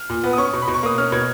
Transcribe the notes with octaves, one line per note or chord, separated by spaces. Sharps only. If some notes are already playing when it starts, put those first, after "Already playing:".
Already playing: F6
A#2
B3
D#6
C#4 C#6
B2
B5
B2
C#6
A#3 D#6
C#4 F6
B2 G#6